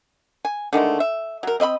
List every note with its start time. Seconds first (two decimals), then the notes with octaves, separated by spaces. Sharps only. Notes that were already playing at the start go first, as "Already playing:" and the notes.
0.45 G#5
0.73 D3 D#3 G#3 A3
1.00 E5
1.43 F#3 A#4
1.60 C4 D#5 E5 B5